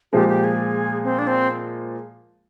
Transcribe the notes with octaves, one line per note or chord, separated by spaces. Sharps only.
A#2 F3 G#3 G4
G4
G#4
C4
D4
C4